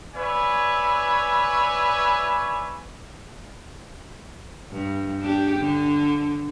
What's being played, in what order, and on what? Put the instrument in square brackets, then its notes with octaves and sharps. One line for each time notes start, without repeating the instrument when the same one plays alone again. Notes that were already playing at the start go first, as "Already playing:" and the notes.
[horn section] B4 C#5 D5 E5 G#5
[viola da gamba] G2
D4 G4
D3